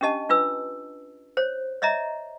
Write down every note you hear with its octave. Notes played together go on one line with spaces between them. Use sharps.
C#4 D4 G4 D#5 A5
D4 F4 B4 E6
C5 C#5
C#5 D#5 E5 A#5